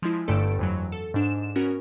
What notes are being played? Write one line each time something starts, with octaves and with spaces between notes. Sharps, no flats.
F3 G#3 E4
G1 G2 D3 A3 A4 D7
F2 E3 F#3
A4
G#2 D4 E7
B3 C#4 F#4 A#4